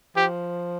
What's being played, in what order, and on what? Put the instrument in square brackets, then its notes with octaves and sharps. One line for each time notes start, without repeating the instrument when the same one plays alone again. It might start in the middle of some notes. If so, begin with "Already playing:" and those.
[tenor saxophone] F3 [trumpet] G4